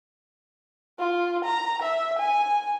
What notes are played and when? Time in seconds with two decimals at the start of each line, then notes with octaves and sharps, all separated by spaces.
0.99 F4
1.45 A#5
1.82 E5
2.19 G#5